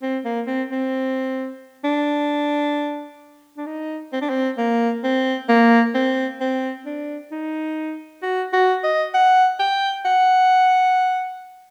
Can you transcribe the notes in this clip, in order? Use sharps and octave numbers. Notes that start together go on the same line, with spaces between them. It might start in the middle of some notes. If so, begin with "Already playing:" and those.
C4
A#3
C4
C4
D4
D4
D#4
C4
D4
C4
A#3
C4
A#3
C4
C4
D4
D#4
F#4
F#4
D#5
F#5
G5
F#5